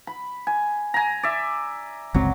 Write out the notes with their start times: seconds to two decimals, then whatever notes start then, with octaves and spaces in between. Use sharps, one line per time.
0.07 B5
0.47 G#5
0.94 G#5 A#5
1.23 D5 E5
2.14 G1 C#2 F#3 C4